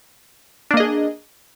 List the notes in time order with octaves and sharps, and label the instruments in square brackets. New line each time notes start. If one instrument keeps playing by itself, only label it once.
[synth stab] D4
A#3
D#5
G#4